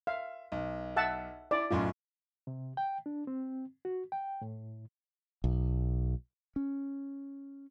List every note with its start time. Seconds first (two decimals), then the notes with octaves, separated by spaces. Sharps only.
0.07 E5 F5
0.52 B1
0.96 E5 F#5 A5
1.51 E4 D5
1.71 B1 F#2 A2 F4
2.47 C3
2.77 G5
3.06 D4
3.27 C4
3.85 F#4
4.12 G5
4.41 A2
5.44 B1
6.56 C#4